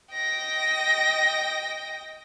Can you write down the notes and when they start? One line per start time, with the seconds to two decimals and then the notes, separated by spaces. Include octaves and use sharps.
0.13 D#5 G5 A#6